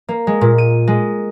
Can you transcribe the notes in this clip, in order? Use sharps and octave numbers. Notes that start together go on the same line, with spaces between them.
A#3
G#3
A#2
D#7
G#3